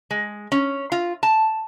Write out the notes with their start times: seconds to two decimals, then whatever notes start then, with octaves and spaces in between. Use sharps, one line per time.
0.11 G#3
0.52 C#4
0.92 F4
1.23 A5